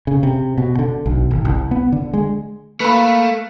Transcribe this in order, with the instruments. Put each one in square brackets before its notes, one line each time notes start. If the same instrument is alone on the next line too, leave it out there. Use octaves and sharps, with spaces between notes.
[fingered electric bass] C#3
C3
B2
D3
B1
G#1
C2
B3
D3
G#3
[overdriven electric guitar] A3 [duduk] A#3 [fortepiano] B4 B5